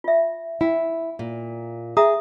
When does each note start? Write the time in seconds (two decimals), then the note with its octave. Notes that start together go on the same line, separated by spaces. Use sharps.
0.04 F4 E5
0.61 E4 G5
1.19 A#2
1.97 G#4 E5 A#5 D#6